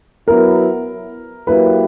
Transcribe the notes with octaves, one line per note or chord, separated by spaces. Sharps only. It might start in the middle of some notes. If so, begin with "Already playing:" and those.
F#3 B3 E4 A#4
F#3 A#3 E4 G4 B4